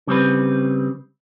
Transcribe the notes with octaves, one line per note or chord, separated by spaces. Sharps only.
C#3 G3 C4 B4